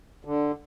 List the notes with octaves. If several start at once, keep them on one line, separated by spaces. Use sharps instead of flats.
D3